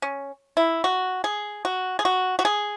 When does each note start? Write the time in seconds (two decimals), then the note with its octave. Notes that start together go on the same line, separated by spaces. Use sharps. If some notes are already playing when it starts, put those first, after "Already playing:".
0.02 C#4
0.57 E4
0.84 F#4
1.24 G#4
1.65 F#4
1.99 G#4
2.05 F#4
2.39 F#4
2.45 G#4